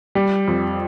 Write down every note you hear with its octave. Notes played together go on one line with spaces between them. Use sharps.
G3
F2